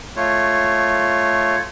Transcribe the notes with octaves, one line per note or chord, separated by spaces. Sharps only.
A3 F4 C#5